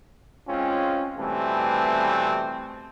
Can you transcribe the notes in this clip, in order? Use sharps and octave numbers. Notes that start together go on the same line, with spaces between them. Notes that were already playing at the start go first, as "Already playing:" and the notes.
G#3 C4 C#4 F4
B2 E3 G3 A3 C4